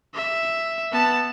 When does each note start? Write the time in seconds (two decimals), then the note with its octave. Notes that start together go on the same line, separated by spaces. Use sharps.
0.14 E5
0.93 B3 A5